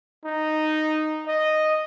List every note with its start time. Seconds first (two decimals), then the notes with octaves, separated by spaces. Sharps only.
0.25 D#4
1.27 D#5